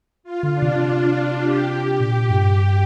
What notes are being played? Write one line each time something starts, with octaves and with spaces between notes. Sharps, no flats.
F4
D3
D4
C3
D4
G4
A#2 G4
G2